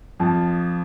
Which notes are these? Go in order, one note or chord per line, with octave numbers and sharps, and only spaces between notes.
F2 F3 A5